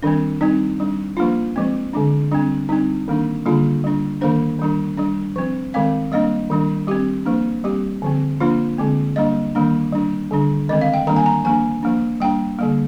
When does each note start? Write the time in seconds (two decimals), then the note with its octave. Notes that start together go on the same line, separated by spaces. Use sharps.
0.03 D#3 G3 C4 D4
0.41 G3 C4 D#4
0.80 G3 D4
1.17 F3 A#3 D4 F4
1.56 F3 G#3 C4
1.93 D3 G#3 D4
2.32 G3 C4 D4
2.69 G3 C4 D#4
3.08 D#3 A#3 D4
3.46 D3 G3 A#3 D4 F4
3.84 G3 D4
4.21 D#3 A#3 D4 C5
4.59 D#3 G3 D4
4.97 G3 D4
5.36 F3 C4
5.74 D#3 G#3 C4 F5
6.12 G3 A#3 D4 D#5
6.50 D#3 G3 D4
6.88 G3 C4 G4
7.26 F3 A#3 D4
7.64 G3 C4 G4
8.02 D3 F3 C4
8.40 F3 A#3 D4 F4
8.78 D3 G#3 C4
9.16 G3 A#3 D4 D#5
9.55 D#3 G3 A#3 D4
9.92 G3 D4
10.31 D3 G3 D4
10.69 D#3 G#3 C4 D#5
10.81 F5
10.94 G5
11.07 D#3 G3 A#3 D4 A#5
11.16 G#5
11.26 A#5
11.44 F3 A#3 D4 G#5
11.83 F3 A#3 D4
12.20 G3 A#3 D4 G5
12.59 D3 G3 A#3